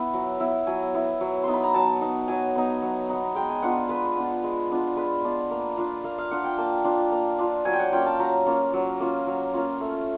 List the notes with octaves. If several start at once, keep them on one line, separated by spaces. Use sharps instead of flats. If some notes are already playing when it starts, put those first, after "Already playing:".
Already playing: B3 E4
F#3
B3 E4
F#3 G#5
B3 E4
F#3
B3 D#4 C6
B5
A#5
F#3 A5
B3 D#4
F#3 G#5
B3 D#4
F#3
B3 D#4
G#3 G5
G#5
B3 D4 F4 F#5
G#3 B4
B3 D4 F4
G#3
B3 D4 F4
G#3 B4
B3 D4 F4
A#3
D4 F4
A#3 F5
F5
D4 F4 F#5
G5
A#3 A5
D4 F4
A#3
D4 F4
F#3 G#5
G5
F#5
A#3 C#4 F4 G5
A5
F#3 A#5
A#3 C#4 F4
F#3
A#3 C#4 F4
F#3
A#3 C#4 F4
A3